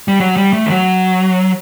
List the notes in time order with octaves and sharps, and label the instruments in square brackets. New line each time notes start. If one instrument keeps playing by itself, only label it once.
[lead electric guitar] G3
F#3
G3
A3
D#3
F#3